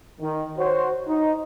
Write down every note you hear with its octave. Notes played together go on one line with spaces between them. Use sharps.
D#3
F#4 C5 C#5
D#4